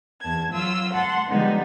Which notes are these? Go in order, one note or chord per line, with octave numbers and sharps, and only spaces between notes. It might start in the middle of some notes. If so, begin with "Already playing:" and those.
E2 A5 G#6
F#3 F4 E6
F#5 A5 C6
D3 F3 G3 G#3 B3 D#4